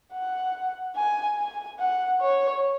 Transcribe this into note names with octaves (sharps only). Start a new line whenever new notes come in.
F#5
G#5
G#5
F#5
C#5